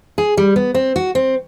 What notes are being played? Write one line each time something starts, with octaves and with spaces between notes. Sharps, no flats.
G#4
G3
B3
C4
F#4
C4